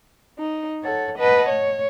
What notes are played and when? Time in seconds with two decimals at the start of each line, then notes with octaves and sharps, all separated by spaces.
0.38 D#4
0.84 A4 C#5 F#5
1.18 B4 D#5 F#5 A5
1.49 C#5